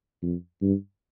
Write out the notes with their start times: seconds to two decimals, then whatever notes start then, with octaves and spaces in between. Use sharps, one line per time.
0.22 F2
0.61 G2